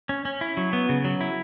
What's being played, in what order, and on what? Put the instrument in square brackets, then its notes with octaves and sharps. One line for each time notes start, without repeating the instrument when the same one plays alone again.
[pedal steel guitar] C#4
C#4
E4
F#3
B3
C#3
F#3
E4